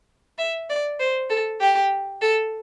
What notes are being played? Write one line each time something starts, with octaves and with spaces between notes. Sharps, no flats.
E5
D5
C5
A4
G4
A4